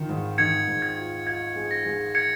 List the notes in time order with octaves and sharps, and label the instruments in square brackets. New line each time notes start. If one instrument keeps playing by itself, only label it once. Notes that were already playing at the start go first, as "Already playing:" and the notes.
Already playing: [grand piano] D#3 F4
G#2
[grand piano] D#3 [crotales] G#6 C#7
[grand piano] G#2
[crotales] G#6
[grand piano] F4
[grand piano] F4 [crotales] G#6
[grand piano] G#3
[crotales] A#6
[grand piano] G#3
[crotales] G#6 C#7